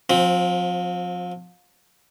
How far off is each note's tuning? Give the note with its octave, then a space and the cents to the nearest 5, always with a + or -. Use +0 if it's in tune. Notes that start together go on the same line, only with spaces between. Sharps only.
F3 +35 C4 +5